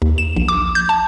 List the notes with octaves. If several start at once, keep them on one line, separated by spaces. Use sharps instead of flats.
D#2
E7
A#1
D6
G6
A5